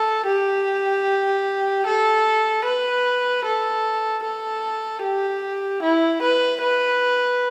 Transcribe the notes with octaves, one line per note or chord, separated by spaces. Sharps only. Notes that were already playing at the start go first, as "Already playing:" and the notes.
Already playing: A4
G4
A4
B4
A4
A4
G4
E4
B4
B4